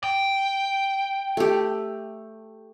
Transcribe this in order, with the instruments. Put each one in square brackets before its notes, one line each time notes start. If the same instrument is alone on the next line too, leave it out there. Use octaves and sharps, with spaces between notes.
[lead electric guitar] G5
[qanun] A3 G4